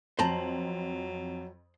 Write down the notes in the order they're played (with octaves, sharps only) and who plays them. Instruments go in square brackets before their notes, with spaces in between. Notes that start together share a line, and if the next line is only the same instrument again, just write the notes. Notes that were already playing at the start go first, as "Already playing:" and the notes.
[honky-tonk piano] F2 F#7 [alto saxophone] F#3 [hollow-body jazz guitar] C5 A5 A#5